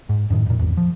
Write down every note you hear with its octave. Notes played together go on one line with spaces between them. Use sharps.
G#2
F#2 A2 D#3
F2 A#2
G#1 E2
F3